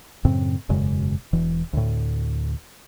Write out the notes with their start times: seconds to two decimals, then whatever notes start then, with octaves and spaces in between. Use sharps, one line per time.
0.25 F#2 A2 C#3 C4
0.69 E1 F#2 C#3 G#3
1.33 E1 E3
1.73 D2 A2